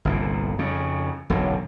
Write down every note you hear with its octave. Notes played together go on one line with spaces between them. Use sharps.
G1 C2 A#2
F2 C#3
E1 B1 F#2 D3